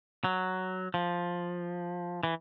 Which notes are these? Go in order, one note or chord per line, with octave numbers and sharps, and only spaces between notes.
F#3
F3
E3